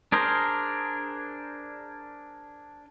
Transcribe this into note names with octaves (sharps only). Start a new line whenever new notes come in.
D4 G#4 A#4 C5